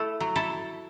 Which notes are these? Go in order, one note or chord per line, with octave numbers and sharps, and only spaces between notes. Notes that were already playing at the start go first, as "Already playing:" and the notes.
Already playing: A3 E4 A4
F#3
E4 A4